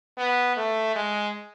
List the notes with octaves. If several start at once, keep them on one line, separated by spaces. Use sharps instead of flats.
B3
A3
G#3